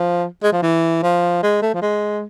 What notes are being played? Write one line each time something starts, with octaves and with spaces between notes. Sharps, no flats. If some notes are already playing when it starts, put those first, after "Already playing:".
Already playing: F3
G#3
F3
E3
F3
G#3
A3
F3
G#3